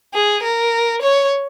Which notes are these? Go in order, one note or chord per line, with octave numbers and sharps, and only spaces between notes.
G#4
A#4
C#5